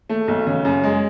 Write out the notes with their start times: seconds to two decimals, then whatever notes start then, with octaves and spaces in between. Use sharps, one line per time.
0.09 A3
0.28 B1
0.47 C#3
0.65 F#2
0.84 G#3